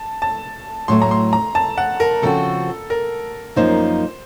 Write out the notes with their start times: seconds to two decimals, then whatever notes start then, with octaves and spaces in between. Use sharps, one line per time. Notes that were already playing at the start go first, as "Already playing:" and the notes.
Already playing: A5
0.22 A5
0.88 A2 F#3 A3 C6
1.02 A#5
1.11 C6
1.33 A#5
1.55 A5
1.78 F#5
2.00 A#4
2.22 C#3 F3 C4 F#4 A4
2.90 A#4
3.56 F#2 F3 A#3 D#4 C5